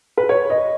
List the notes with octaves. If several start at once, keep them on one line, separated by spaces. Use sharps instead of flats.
B4
C#5
D#5